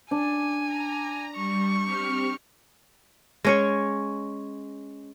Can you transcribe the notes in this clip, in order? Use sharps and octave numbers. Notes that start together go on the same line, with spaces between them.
D4 G#5
A#5
G3 C#6
C4 G4 F6
G#3 C#4 C#5